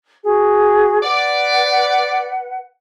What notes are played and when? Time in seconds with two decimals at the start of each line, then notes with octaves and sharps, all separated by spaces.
0.25 F#4 G#4
1.03 B4 D5 F#5